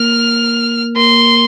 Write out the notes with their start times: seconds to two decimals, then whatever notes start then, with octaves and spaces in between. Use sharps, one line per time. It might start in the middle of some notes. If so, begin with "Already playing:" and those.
Already playing: A#3 A#4 F6
0.96 A#3 A#4 C6